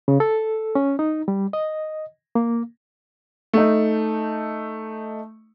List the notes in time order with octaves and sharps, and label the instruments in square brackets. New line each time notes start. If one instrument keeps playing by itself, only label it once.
[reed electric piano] C#3
A4
C#4
D#4
G3
D#5
A#3
[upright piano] A3 D#4